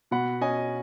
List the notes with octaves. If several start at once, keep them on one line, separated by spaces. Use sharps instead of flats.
B2 F#5 B5
C#4 D#5 G#5